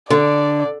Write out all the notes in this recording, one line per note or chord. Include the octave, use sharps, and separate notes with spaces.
D3 D5